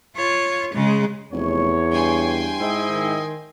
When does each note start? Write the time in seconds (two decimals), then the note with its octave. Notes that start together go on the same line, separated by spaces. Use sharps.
0.16 F4 C#5
0.73 C#3 G#3
1.32 F1 E2 C#5
1.92 G2 G5 G#5 C6
2.60 G#2 C4 E4 D#5
2.90 D#3